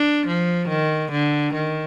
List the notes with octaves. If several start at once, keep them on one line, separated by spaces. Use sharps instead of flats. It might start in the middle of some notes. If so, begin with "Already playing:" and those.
Already playing: D4
F3
D#3
D3
D#3